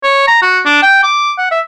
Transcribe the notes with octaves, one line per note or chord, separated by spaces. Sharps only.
C#5
A#5
F#4
D4
G5
D6
F#5
E5